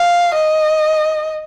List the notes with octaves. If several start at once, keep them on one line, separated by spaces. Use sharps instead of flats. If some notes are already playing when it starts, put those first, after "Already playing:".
Already playing: F5
D#5